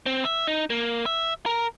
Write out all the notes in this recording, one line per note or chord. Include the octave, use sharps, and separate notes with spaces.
C4
E5
D#4
A#3
E5
A#4